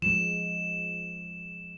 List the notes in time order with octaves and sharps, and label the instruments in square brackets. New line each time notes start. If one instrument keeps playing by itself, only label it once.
[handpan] F3 G#3 [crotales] E7